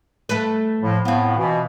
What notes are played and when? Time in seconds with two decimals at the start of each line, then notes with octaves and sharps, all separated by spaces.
0.29 A3 B4
0.82 A2 F3
1.05 A2 B3 C4 F4
1.37 B2 E3